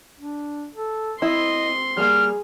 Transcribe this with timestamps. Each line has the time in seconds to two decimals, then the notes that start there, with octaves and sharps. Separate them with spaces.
0.20 D4
0.75 A4
1.22 C4 E4 D#5 C6
1.97 G3 A#3 G#4 F6